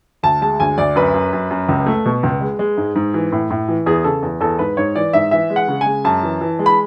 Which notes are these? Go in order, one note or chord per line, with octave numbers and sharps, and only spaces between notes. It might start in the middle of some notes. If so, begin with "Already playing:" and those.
D2 A5
G#3 A5
D2 G#5
D2 D5
F#2 B4
F#2
F#2
F#2
C#2
A3
B2
C#2
G#3
G#3
G#2
G#2
E3
A2
A2
E3
E2 G#4
C#3 A4
E2
E2 A4
G#2 B4
G#2 C#5
E3 D5
G#2 E5
E3 E5
G#3
F#5
C#3
G#3 G#5
F#2 A5
E3
E3
G#3
B5